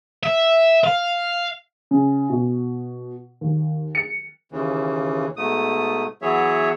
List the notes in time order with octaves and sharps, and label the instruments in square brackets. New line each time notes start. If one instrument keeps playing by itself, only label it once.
[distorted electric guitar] E5
F5
[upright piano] C#3
B2
D#2
C#7
[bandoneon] D#2 C#3 E3
G#2 B2 A3 D#6
E3 F#3 B3 G#4 C#5 E5